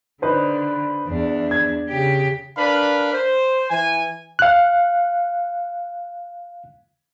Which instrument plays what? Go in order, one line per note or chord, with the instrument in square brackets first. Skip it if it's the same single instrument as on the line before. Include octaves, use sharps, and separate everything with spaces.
[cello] D3 [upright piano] D#4 B4 C5
[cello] E2 D4
[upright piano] G#6
[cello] C#3 G4
[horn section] D4 A#4 B4 F5 B5
C5
E3 G#5
[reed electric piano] F5 F#6